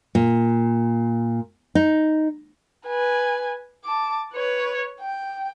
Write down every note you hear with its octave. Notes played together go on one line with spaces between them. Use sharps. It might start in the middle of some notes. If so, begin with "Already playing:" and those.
A#2
D#4
B4 G#5
A5 D6
B4 C#5
G5